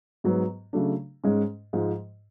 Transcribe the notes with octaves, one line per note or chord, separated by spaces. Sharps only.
G#2 F#3 B3
C#3 F#3 A3 D4
G#2 G#3 C#4
G#2 F3 G#3